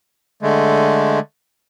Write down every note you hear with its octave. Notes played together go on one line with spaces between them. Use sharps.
D3 G#3 A3